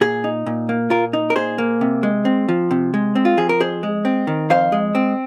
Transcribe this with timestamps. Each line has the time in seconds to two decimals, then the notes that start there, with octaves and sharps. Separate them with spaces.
0.01 A#2 G#4
0.24 D#4
0.46 A#2
0.69 A#3
0.90 A#2 F4 A#4
1.13 D#4
1.30 A#4
1.36 A#2 G#4 C5
1.58 A#3
1.81 C3
2.03 G#3
2.25 C4
2.49 F3
2.71 C3
2.94 G#3
3.15 C4
3.25 F4
3.37 F3 G#4
3.49 A#4
3.60 F2 G#4 C5
3.83 G#3
4.05 C4
4.27 D#3
4.50 F2 C5 F5
4.72 G#3
4.95 C4